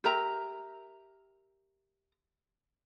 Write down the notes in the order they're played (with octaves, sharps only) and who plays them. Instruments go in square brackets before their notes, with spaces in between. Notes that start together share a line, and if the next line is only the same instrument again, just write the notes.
[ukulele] G4 A#4 E5 A#5